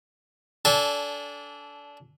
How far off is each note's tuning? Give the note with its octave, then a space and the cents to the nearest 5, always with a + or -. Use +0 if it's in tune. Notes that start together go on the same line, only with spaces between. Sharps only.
D4 -25 A4 -5 G#5 -20